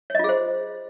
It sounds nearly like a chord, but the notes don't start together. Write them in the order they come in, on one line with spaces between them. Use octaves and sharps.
C#5 D#5 F4 G#4 C5